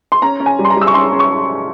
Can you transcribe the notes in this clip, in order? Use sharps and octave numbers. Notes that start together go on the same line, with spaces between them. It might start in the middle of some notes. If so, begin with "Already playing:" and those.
C6
C#4 A#5
C#4
G#5
G3
C6
A#5
G3 E6
C#6
C#4 C6
C#4
C#6